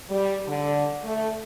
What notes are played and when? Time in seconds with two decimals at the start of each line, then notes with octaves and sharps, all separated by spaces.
0.10 G3
0.46 D3
1.03 A3